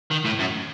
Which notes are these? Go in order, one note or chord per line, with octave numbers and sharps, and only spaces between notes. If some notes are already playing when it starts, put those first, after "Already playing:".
D#3
A2
F#2